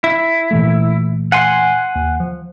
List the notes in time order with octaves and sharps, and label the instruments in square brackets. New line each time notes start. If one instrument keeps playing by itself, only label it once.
[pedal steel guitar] E4
[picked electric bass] A#2 E3 A3
[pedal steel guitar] F#5 G#5 C6
[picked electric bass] D#2
F3